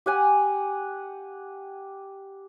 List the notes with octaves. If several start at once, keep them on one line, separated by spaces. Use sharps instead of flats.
G4 F#5 G#5